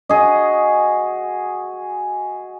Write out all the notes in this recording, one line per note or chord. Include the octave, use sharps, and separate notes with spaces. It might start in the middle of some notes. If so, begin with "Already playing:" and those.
F#4 G#4 D#5